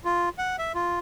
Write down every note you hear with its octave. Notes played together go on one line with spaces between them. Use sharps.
F4
F#5
E5
F4